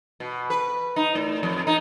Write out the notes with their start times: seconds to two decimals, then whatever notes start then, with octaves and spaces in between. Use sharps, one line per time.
0.20 B2
0.50 B4
0.96 D#4
1.15 A2
1.43 F2
1.67 D#4